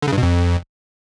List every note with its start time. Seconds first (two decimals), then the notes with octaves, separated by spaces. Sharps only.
0.02 D3
0.08 C#3
0.13 G2
0.18 B2
0.23 F2